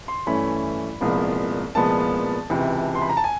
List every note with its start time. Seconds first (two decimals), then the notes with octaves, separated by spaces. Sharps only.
0.08 C6
0.27 G2 E3 A3 C#4 E4 B5
1.01 C2 A#2 F3 G#3 B3
1.75 C2 A#2 F3 G#3 B3 A5
2.50 C#2 C3 E3
2.95 C6
3.02 B5
3.09 A#5
3.17 A5
3.24 G#5